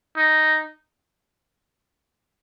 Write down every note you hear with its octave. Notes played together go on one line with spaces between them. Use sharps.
D#4